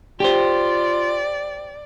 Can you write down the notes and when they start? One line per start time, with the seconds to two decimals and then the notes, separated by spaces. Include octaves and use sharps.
0.20 F4 G4 C5 D5